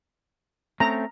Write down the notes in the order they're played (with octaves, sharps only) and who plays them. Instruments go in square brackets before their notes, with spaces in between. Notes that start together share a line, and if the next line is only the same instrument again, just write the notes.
[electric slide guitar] A3 C4 C#4 [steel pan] A#5